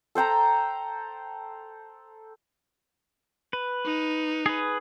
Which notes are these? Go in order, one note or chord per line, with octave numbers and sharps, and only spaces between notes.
A4 C5 G5 A#5
B4
D#4
G#4 B4